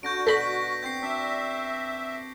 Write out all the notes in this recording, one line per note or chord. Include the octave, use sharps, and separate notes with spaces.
D3 F#4 G6 A#6 D7
B2 A4 B5 G6 A#6 B6
C4 F#4 G6 A#6 C7
D4 E5